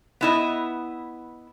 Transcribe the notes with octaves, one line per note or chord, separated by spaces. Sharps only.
B3 E4 D#5